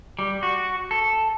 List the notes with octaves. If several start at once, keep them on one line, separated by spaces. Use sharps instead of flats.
G3
F#4
A4